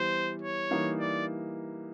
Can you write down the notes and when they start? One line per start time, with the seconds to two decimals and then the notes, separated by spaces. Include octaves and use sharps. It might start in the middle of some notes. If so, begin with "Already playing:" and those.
Already playing: E3 G3 B3 C5
0.42 C#5
0.71 E3 G3 A#3 D#4
1.00 D5